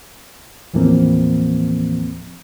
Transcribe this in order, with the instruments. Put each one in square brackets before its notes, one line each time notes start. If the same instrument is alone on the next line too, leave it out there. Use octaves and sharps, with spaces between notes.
[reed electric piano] D#2 A2 E3 F3 A#3 C4